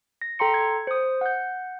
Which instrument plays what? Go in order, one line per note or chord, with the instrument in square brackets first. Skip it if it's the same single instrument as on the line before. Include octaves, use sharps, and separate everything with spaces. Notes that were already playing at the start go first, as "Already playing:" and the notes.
[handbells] A#6
A4 G5 A#5 C6 C#7
G#6
C5 D#6
F#5 G6